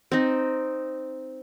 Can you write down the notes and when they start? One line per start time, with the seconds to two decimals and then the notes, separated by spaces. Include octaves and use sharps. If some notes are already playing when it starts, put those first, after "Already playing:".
0.12 C4 D#4